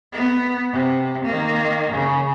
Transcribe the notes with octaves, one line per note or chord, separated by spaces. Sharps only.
B3
C3
D#3 A#3
C#3